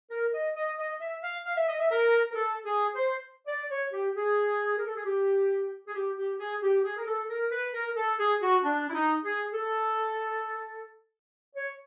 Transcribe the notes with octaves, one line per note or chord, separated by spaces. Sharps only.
A#4
D#5
D#5
D#5
E5
F5
F5
E5
D#5
E5
A#4
A#4
A4
G#4
C5
D5
C#5
G4
G#4
A#4
A4
G#4
G4
G#4
G4
G4
G#4
G4
G#4
A#4
A4
A#4
B4
A#4
A4
G#4
F#4
D4
E4
D#4
G#4
A4
C#5